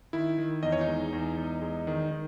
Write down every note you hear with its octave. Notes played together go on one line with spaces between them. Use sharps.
D#3 E4
D#3
E2 D#5
C#5
D#4 D#5
G#3
E2
E2
G#3
D#3
D#3